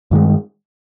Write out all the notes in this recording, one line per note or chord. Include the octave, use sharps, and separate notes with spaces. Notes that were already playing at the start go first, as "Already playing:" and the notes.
G2 D#3 G#3